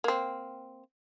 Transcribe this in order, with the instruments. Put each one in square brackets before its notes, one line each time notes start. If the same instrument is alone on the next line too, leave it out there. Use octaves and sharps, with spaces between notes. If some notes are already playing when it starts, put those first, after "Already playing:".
[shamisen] A#3 C4